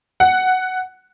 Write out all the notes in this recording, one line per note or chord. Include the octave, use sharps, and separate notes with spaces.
F#5